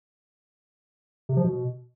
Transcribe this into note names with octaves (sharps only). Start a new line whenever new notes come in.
C3
F3
B2